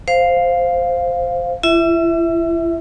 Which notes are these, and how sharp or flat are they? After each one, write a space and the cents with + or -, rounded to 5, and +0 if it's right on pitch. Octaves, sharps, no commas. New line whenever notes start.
C5 +0 F5 +0
E4 +40 E5 -10